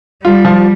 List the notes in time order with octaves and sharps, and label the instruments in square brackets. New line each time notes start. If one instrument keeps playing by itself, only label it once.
[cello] G3 [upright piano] F4
[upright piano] F3